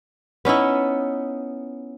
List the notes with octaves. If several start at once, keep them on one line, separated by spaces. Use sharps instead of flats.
B3 C#4 D#4 E4